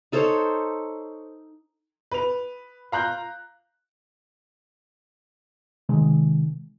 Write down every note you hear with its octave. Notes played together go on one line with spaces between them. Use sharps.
D#4 A4 C5 C#5
B4 F7
F5 A#5 F#6 G6
C3 D#3 G#3